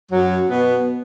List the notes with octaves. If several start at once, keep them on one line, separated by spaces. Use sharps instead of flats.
F#2 F#3
B2 B3